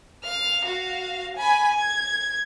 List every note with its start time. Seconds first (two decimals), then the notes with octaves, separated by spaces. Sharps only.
0.24 F5 F6
0.63 F#4 F5
1.37 G#5 B5
1.76 G#6